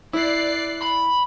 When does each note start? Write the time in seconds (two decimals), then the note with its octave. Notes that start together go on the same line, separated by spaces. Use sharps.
0.13 E4 D5 F#6 C7
0.82 B5